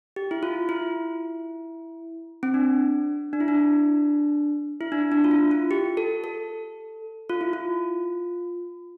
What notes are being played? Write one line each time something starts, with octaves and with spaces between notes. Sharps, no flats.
G4
E4
F4
E4
C4
D4
D4
E4
D4
E4
D4
D4
F4
E4
F4
G4
A4
A4
F4
E4
F4